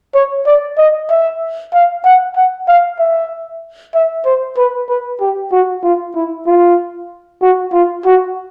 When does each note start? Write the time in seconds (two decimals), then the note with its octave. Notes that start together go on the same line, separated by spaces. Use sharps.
0.14 C#5
0.46 D5
0.78 D#5
1.10 E5
1.73 F5
2.04 F#5
2.36 F#5
2.68 F5
2.99 E5
3.95 E5
4.25 C5
4.57 B4
4.89 B4
5.21 G4
5.52 F#4
5.84 F4
6.15 E4
6.47 F4
7.42 F#4
7.73 F4
8.05 F#4